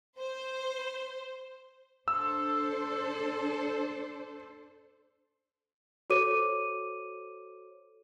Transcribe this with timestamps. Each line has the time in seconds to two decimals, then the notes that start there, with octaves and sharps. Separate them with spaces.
0.18 C5
2.08 D4 A4 C5 E6
6.10 F#4 A4 C5 C#5 D6 D#7